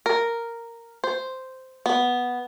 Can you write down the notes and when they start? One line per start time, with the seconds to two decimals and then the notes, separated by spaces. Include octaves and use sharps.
0.06 A#4
1.04 C5
1.86 B3